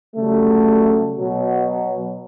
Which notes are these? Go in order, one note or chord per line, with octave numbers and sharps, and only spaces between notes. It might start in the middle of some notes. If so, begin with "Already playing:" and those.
C#3 F#3 G3 A3
B2 F#3